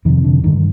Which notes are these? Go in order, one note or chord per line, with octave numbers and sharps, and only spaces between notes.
F2 C3 D#3
D3
G2 D3 D#3